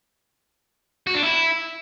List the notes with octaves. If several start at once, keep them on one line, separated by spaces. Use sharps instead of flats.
F#4
D4
E4